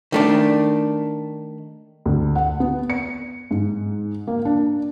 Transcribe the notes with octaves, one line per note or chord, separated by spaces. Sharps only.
D#3 A3 D4
D2
F#5
B3
C#7
G#2
A#3
D4